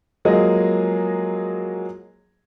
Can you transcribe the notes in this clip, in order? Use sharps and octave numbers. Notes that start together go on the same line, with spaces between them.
F3 F#3 G#3 A#3 G#4 D#5